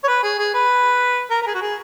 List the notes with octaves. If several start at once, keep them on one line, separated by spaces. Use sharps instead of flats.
C#5
B4
G#4
G#4
B4
A#4
A#4
G#4
F#4
G#4